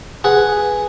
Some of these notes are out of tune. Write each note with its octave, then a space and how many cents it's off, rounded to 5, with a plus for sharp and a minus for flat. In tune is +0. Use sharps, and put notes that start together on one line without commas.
G#4 +0 B4 +0 F#5 +0